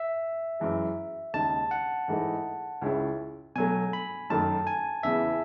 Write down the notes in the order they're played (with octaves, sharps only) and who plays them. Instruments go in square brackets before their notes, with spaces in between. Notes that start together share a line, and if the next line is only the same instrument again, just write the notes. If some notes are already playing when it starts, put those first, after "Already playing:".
Already playing: [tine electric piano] E5
[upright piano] F#2 E3 G#3
[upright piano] D#2 C#3 G#3 D#4 [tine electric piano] A5
[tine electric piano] F#5
[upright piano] G#2 E3 A3 D#4
C#2 C#3 G#3 C#4 E4
[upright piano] B2 F#3 A3 [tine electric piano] G#5
[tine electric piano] B5
[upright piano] F#2 D#3 A3 [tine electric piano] A5
[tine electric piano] G#5
[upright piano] E2 C#3 E3 [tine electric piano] E5